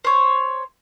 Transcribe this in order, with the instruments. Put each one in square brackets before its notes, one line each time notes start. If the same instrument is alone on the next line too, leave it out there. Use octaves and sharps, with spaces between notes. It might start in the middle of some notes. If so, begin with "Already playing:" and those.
[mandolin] C5 C#5